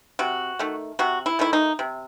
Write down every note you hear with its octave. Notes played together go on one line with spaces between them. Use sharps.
C3 F#4
D#3 A3
C3 F#4
E4
D#3 A3 E4
D#4
C3